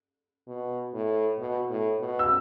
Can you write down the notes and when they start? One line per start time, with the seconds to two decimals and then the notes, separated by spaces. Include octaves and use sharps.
0.48 B2
0.94 A2
1.39 B2
1.70 A2
2.00 B2
2.19 E6